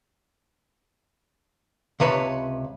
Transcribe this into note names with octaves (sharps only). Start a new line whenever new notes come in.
C#2 C3 B4 C#5 A5